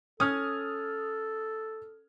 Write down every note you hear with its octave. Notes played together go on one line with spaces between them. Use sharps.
C#4 A4 D#6 F6 G#6